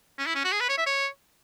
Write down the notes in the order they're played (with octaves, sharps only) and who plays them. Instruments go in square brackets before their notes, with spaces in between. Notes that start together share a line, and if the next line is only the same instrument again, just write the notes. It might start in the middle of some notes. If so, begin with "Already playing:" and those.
[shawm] C#4
E4
C#4
F#4
G#4
B4
C#5
E5
C#5